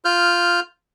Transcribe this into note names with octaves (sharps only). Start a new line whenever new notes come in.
F4 F6 G6